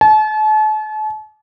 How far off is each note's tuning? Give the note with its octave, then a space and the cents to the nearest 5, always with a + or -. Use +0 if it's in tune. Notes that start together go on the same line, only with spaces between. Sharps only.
A5 -40